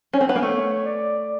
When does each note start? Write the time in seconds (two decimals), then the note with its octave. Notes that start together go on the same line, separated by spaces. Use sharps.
0.13 C#4
0.21 C4
0.29 B3
0.36 A#3
0.43 A3 C#5
0.84 D5